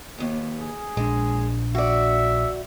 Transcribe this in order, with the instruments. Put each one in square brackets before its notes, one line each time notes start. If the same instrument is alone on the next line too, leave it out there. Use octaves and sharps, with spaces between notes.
[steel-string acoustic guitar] D#2 B3
[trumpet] G#4
[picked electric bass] A#1 D4 [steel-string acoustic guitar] G#3
[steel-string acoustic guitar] F#4 D5 [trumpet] E5